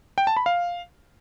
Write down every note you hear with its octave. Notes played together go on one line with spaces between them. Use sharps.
G5
A5
B5
F5